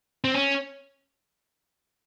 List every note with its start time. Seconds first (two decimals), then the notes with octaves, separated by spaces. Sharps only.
0.24 C4
0.34 C#4